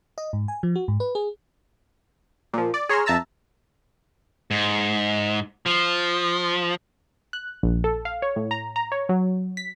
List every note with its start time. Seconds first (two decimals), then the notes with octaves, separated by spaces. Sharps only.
0.18 D#5
0.33 G#2
0.48 G#5
0.63 F3
0.75 F#4
0.88 G#2
1.00 B4
1.15 G#4
2.53 A#2 F3
2.74 D5
2.89 G#4 C#5 A#5 C6 E6 F6
3.06 F2 E5 A5 A#5 E6
4.51 G#2
5.66 F3
7.33 F#6
7.63 A#1
7.84 A4
8.05 F5
8.22 C#5
8.36 A2
8.51 A#5
8.76 A#5
8.92 C#5
9.09 F#3
9.57 B6